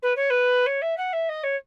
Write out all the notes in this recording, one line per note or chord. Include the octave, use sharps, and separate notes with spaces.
B4
C#5
B4
C#5
E5
F#5
E5
D#5
C#5